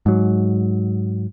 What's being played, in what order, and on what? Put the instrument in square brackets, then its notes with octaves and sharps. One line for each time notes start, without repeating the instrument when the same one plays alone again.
[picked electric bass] G#2 F#3